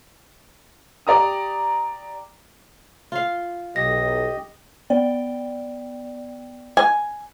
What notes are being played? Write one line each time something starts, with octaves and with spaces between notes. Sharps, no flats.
G4 D5 A#5 D#6
F4 F5
B1 G4 D#5 A#6
B3 D5 G5
G#5